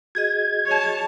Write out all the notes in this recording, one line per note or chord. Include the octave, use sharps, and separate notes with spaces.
F#4 G#4 D#5 G#6
C#5 A5